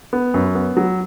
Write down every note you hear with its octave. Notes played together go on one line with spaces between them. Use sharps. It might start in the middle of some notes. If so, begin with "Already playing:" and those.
B3
F#2
B3
F#3